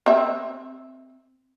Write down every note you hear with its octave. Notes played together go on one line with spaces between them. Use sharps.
C4 E5